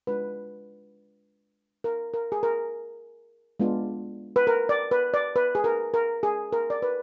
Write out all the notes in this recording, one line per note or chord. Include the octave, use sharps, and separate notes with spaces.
G#3 D4 F4 B4
A#4
A#4
G#4
A#4
G#3 B3 D4 F4
B4
A#4
D5
B4
D5
B4
G#4
A#4
A#4
G#4
A#4
D5
B4